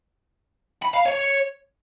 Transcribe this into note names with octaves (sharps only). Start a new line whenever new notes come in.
B5
F5
C#5